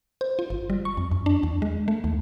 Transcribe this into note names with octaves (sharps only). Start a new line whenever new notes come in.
C5
F4
G1
G3
C#6
F2
F#2
D4
E2
G#3
A3
D#2